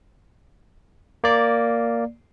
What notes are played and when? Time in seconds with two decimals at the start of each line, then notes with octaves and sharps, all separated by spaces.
1.24 A#3 D5